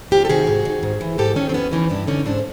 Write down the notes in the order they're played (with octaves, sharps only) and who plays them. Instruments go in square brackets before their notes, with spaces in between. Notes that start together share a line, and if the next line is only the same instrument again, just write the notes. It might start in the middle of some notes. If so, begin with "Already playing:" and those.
[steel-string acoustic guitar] D2 F4 G4
A4
C3 D#3 F#4 G#4
G#2
D#3
G#2
E3
G#2 G4 A4
D#3 C#4 D#4
C4
F2 B3 C#4
C#3 E3 C#4 D#4
G2 D4 E4
D3 C#4 D#4
G#2 C4 D4